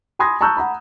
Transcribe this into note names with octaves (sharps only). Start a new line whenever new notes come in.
G#5 B5 C6 D#6 G#6 A#6
A5 A#5 C#6 E6 F#6 G6
F#5 A#5 B5